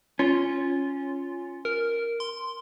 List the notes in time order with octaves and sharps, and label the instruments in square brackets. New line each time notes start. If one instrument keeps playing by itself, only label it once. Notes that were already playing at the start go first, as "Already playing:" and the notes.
[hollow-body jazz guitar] C#4 [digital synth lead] F4
[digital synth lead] A#4
C6